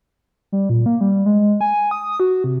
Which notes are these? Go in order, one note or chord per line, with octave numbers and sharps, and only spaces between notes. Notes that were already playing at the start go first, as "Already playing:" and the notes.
G3
A#2
A#3
G3
G#3
G#5
D#6
F#4
C3